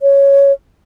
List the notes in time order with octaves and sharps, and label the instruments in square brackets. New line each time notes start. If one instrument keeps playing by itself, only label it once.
[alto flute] C#5